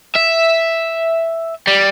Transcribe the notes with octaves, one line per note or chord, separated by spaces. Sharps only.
E5
G3